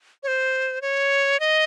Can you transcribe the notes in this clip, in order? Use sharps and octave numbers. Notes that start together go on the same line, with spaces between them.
C#5
C5
C#5
D#5